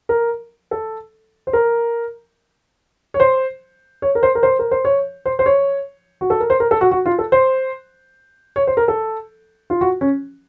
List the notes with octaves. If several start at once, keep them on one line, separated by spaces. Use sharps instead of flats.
A#4
A4
C5
A#4
C#5
C5
C#5
A#4
C5
A#4
C5
A#4
C5
C#5
C5
C5
C#5
F#4
A4
A#4
C5
A#4
A4
F#4
F#4
F4
A4
C5
C#5
C5
A#4
A4
F4
F#4
C#4